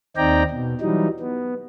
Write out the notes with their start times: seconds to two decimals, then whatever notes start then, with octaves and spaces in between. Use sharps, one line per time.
0.17 D#2 C4 D#4 D5 G5 A#5
0.50 B2
0.81 E3 F#3 G3 D#4
1.19 B3